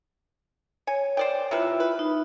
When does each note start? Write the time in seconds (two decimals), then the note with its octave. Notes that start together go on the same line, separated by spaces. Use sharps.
0.87 C#5 G#5
1.17 C5 D5 G5
1.51 C3 E4 F4 B4 E5
1.80 B4
1.99 D#4